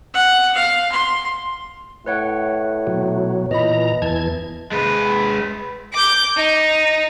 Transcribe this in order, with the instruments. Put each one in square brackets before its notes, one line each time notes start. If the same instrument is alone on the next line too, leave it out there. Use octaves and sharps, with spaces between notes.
[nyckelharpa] F#5
F5
C6
[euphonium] A2 [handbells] B4 C#5 F#5
[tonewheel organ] B2 F#3
[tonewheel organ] A#2 E3 A#5 [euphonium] B4 [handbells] D#5 B5
[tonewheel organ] E2 E3 G#6 [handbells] A5
[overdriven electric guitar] G#3 B4
[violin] D6 G6
D#4